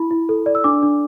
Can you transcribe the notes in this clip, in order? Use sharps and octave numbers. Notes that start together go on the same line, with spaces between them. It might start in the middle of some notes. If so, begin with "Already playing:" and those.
Already playing: E4 B5
E4
A4
D5
E6
D4 D6
D4